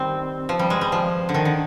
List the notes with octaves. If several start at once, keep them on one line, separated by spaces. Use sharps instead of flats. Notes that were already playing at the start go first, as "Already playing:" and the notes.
Already playing: D#3 G3 C4
F3
G3
G#3
G3
F3
D3
D#3
D3